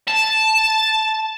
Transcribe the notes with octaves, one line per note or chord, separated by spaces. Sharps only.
A5